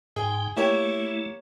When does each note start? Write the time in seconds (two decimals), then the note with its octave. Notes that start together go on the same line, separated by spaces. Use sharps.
0.16 G#2 G#4 G5
0.57 A3 A#3 E4 G4 C#5